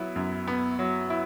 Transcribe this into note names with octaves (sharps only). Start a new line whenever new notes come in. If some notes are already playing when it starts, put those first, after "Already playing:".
Already playing: F#3 B3 E4
F#2
B3
F#3
E4